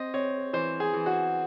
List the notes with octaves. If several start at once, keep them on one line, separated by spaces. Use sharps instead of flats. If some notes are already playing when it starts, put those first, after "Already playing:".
Already playing: C4 D#5
C4 C#5
E3 C5
G#4
E3
F#4